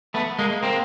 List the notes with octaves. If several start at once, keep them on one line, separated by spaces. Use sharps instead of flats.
A3 B3
G#3 A#3
A#3 C4